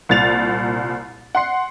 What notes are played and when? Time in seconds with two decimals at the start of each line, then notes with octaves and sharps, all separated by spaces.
0.09 C2 A#2 A6 F7
1.35 F#5 C6 C7